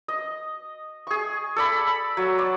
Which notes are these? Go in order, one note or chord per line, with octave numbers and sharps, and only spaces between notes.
D#5
G#4 C#6
A4 D5 B5
F#3
D5